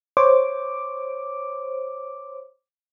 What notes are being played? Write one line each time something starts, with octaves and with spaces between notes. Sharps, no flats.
C5 C#5 D6